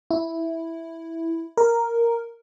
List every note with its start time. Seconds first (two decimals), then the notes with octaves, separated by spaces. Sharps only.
0.11 E4
1.57 A#4